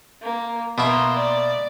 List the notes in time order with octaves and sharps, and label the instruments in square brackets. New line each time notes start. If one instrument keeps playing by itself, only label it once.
[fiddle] A#3
[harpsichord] B2 E4 [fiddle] A#3 C6
[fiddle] D5